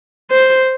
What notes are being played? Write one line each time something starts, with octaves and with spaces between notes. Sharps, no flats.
C5